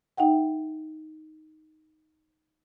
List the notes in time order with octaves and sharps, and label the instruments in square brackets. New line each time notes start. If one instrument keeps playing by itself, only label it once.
[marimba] D#4 E5 F#5 G5